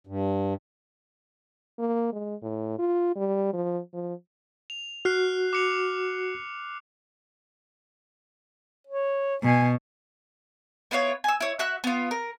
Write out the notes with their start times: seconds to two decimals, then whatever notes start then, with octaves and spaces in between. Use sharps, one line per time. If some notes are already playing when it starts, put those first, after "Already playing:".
0.07 G2
1.79 A#3
2.13 G#3
2.42 A2
2.79 F4
3.16 G3
3.53 F3
3.94 F3
4.70 F7
5.05 F#4 F6 F#6 C7
5.53 D6 C#7 F7
8.87 C#5
9.44 B2 G#5
10.91 B3 E4 F4 C#5
11.24 G#5 E6
11.41 E4 C#5
11.59 F#4 E5 F#6
11.84 B3 F4
12.11 A#4